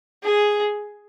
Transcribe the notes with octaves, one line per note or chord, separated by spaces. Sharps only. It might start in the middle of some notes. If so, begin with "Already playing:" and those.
G#4